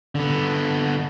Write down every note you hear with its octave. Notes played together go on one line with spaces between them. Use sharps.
D3 B3